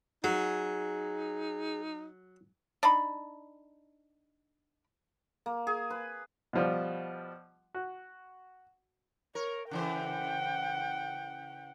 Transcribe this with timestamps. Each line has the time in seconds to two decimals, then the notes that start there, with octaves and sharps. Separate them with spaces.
0.24 F#3 D#4 G#4
2.83 D4 D#4 B5
5.46 A#3
5.67 G#4
5.90 B4
6.53 B2 F3 G3
7.74 F#4
9.35 A#4 C#5
9.71 C#3 E3 C5 F#5 G5